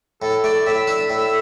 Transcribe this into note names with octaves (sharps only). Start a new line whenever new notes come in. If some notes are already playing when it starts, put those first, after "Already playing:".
A2 A4
A3 D5
A2 E5
D4 E5
A2 E5